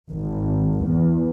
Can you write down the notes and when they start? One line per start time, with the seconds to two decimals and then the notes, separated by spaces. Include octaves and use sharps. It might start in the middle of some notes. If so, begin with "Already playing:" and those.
0.10 G#1
0.83 E2